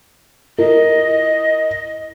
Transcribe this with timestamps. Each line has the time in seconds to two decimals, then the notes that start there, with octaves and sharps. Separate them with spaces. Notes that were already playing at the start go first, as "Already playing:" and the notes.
0.58 E4 A#4 D#5